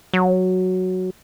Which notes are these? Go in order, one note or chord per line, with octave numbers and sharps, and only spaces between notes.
F#3